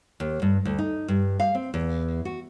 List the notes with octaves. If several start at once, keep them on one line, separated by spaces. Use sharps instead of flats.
D#2
G2
D2
D#4
G2
F5
C4
E2
F#4